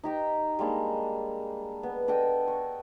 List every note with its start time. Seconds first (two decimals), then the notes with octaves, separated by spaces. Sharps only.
0.04 D#4 G4 G5
0.59 G3 G#3 A#3 D4
1.83 B3
2.08 D4 A4 D#5 G5
2.48 C#6